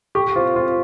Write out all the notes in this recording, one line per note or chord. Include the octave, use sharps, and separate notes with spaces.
G4 C#6
F4 C5
F4 C5